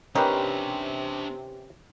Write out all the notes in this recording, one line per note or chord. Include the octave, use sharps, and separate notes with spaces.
C3 D#3 C#4 D4 G4 B4 C5